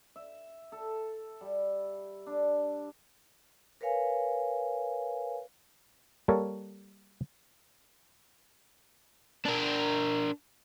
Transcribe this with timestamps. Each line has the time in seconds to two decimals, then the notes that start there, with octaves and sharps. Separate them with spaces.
0.16 E5
0.72 A4
1.41 G3
2.27 D4
3.81 A#4 B4 C#5 F5 G#5
6.28 G3 A#3 A4 A#4 C#5
9.45 D4 A#4